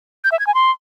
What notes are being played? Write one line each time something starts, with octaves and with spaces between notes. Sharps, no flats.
G6
E5
G#6
G#5
C6